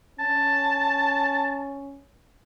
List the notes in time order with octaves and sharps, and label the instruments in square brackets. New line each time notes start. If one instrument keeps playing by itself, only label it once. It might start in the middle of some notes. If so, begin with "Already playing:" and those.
[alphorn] C#4 [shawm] A5